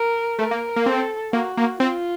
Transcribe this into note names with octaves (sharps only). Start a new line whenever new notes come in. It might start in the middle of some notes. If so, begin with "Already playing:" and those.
Already playing: A#4
A3 A#4
A#3
A#3
C4 A4
A#3 F#4
A#3
C4 F4